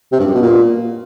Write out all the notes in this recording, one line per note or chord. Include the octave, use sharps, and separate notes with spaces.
C3
G2
F#2
B2
A#2